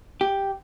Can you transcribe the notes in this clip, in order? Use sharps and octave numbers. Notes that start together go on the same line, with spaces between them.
G4